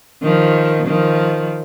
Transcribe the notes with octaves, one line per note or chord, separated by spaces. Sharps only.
D#3 F3
D#3 F3